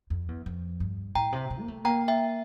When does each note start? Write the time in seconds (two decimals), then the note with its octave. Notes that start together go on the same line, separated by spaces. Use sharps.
0.10 F2
0.28 E2
0.46 F2
0.80 G2
1.15 A2 G5 A#5
1.32 C3
1.50 C3
1.59 A#3
1.68 A3
1.84 A#3 G5 A#5
2.08 E5 G5